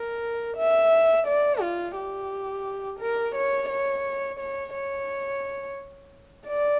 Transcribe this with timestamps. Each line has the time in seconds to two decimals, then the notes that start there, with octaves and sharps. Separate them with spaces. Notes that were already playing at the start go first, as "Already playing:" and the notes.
Already playing: A#4
0.57 E5
1.27 D5
1.61 F4
1.96 G4
3.00 A#4
3.35 C#5
3.69 C#5
4.39 C#5
4.74 C#5
6.47 D5